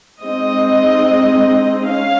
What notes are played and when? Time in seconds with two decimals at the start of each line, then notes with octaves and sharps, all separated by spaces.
0.21 G#3 C4 D#4 D#5
1.88 C#4 F5